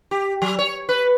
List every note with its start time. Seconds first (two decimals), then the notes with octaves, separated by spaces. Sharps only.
0.11 G4
0.42 F#3
0.59 C#5
0.89 B4